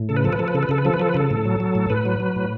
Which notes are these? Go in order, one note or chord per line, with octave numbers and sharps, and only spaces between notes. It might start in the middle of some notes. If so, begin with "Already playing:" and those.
Already playing: A2
C#3 A4
B4
F3 A4
B4
F3 A4
B4
C#3 A4
B4
C#3 A4
B4
F3 A4
B4
F3 A4
B4
C#3 A4
A2
F#3
F#3
A2
A2 B4
F#3
F#3
A2